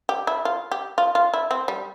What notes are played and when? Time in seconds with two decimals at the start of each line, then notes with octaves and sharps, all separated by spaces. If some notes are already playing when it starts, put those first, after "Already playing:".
0.09 G4
0.27 E4
0.45 F4
0.72 G4
0.98 F4
1.15 F4
1.34 E4
1.51 C4
1.68 G3